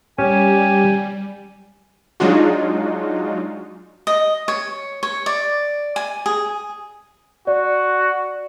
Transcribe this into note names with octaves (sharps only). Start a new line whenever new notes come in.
G3 C#4 G4 G#5
F#3 G#3 D4 D#4 F4 F#4
D#5
C#5
C#5
D5
G#5
G#4
F#4 D5